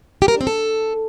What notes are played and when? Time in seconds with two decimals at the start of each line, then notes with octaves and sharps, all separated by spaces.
0.22 G4
0.28 A#4
0.34 D4
0.41 C4
0.47 A4